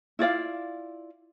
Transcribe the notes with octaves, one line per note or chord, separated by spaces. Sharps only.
E4 F4 D5 F5